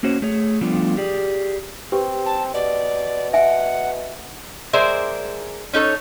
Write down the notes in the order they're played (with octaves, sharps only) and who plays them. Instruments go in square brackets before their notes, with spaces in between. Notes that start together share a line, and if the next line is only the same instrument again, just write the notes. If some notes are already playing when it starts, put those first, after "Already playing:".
[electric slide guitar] A#3 C#4 F#4 C5 C#5
A3 G#4 C#5
F3 G3 A3 B3 D4 F4
G4 G#4 D5
[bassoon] C4 [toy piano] G4 B4
[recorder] A5
[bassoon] B2 [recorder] D5
[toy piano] E5 G#5 [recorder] F#5
[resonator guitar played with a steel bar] G#3 G#4 A#4 C5 D5 E5
C#4 D#4 A4 C#5